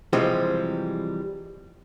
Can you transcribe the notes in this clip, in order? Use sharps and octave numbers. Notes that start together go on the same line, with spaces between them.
C3 E3 F3 G3 G#3 C4